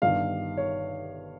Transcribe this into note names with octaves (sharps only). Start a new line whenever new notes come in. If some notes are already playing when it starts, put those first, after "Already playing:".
G1 G2 D#3 F5
C#5